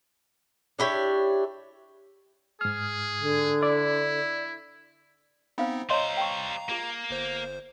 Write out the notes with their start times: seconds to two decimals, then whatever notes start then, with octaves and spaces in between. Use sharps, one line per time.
0.79 D4 E4 G4 C#5
2.61 G#2 G#4 F6
3.18 D3
3.63 E4 D5
5.58 B3 C4 D#4 C5 F5 B5
5.90 G3 C5 C#5 D#5 F5 A#5 C6
6.17 G5 A5 C#6
6.69 A#3 F4 G#4
7.10 G1 C5